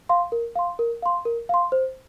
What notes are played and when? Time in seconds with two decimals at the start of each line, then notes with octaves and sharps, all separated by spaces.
0.09 F5 C6
0.32 A#4
0.56 F5 C6
0.79 A#4
1.02 F5 C6
1.25 A#4
1.49 F5 C6
1.72 C5